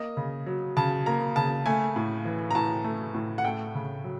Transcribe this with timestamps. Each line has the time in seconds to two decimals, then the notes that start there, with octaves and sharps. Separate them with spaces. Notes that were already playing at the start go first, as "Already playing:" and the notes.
Already playing: A#3 D#5
0.17 C#3
0.46 F#3
0.77 C#3 A5
1.06 A#3 A#5
1.36 C#3 A5
1.66 A3 G#5
1.96 A2
2.25 E3
2.51 A#5
2.55 A2 A5
2.84 A3
3.14 A2
3.38 F#5
3.44 A3 G5
3.75 C#3
4.04 F#3